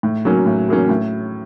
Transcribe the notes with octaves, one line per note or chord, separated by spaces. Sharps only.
A2
F#3 A#3 C#4
A2
F#3 A#3 C#4
A2